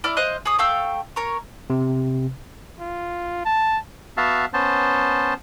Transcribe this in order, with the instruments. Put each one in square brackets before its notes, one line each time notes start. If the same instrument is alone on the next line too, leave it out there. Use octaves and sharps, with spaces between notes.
[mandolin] E4 D5 A#5 F6
C5 D#5 F5 F#6
G#4 C#5 D#6
A3 F5 G5 E6
A#4 C#5
[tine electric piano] C3
[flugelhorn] F4
A5
[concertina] B3 F#4 E5 F5 A5
B3 C#4 C5 A5